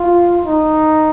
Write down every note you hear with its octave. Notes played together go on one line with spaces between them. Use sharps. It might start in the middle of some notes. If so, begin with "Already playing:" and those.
Already playing: F4
D#4